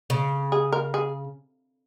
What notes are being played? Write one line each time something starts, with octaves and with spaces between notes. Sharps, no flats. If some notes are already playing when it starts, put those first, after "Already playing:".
C#3
G#4
A#4
G#4